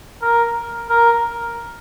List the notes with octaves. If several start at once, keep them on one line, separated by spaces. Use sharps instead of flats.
A#4
A#4